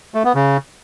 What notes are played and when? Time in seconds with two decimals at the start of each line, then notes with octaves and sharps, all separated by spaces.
0.14 A3
0.25 B3
0.35 C#3